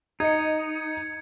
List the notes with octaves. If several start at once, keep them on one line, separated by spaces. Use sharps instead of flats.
D#4 D#5 G#6 C#7